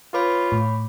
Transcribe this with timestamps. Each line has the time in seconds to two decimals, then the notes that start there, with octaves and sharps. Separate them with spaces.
0.14 F4 B4 C#5 B5 D6
0.52 A2